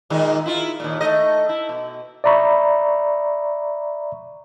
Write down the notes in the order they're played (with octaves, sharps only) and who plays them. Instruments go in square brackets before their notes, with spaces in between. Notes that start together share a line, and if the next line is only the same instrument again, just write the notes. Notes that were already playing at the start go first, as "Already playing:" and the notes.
[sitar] A#2 D#3 G#3
E4 F4
D#2 A#2
A3 D#5
E4
B2
[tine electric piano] D5 E5 A#5 B5 C#6